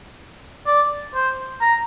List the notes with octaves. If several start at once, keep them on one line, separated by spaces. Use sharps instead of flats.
D5
C5
A#5